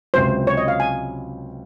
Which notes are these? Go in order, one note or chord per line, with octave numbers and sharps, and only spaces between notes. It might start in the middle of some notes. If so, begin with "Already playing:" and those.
C#2 C3 F#3 C5
C#5
D#5
F5
G#5